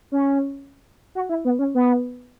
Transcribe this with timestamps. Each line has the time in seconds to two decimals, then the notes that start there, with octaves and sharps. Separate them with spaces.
0.12 C#4
1.15 F#4
1.29 E4
1.45 B3
1.59 C#4
1.75 B3